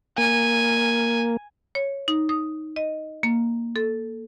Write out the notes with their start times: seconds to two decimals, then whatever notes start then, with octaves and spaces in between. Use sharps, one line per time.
0.18 A#3 G#5
1.75 C#5
2.08 D#4
2.29 D#6
2.76 D#5
3.23 A#3
3.76 A4